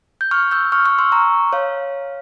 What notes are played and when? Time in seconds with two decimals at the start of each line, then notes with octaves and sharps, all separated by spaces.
0.21 G6
0.31 C#6 F6
0.51 E6 G6
0.72 C#6 F6
0.85 C#6 F6
0.98 C6 E6
1.12 A#5 C#6
1.53 C#5 F5